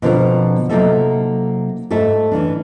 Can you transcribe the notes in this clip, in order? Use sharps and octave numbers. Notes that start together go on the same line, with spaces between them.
B2 D3 F3 C4 D4 A#4
C3 F#3 A#3 D#4 A4 E5
G#2 A3 A4 E5
E3 C#4 D4